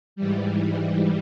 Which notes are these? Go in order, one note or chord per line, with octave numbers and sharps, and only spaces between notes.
G#2 E3 G3